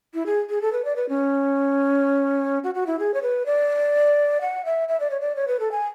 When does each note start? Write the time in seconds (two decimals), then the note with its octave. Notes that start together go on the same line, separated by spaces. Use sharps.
0.14 E4
0.26 G#4
0.50 G#4
0.62 A4
0.72 B4
0.85 D5
0.96 B4
1.09 C#4
2.64 F#4
2.74 F#4
2.87 E4
2.99 G#4
3.14 C#5
3.22 B4
3.46 D5
4.41 F#5
4.65 E5
4.89 E5
5.00 D5
5.10 C#5
5.21 D5
5.36 C#5
5.48 B4
5.60 A4
5.71 G#5